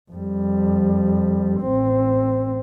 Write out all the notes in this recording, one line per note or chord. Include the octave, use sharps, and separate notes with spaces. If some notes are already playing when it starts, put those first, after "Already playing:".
F2 G3
A1 C4